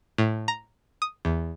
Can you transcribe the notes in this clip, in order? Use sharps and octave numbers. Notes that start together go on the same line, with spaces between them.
A2
A#5
D#6
E2